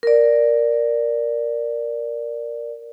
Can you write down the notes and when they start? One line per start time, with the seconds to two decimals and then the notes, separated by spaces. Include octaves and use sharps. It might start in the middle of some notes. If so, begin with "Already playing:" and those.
0.03 A#4 D5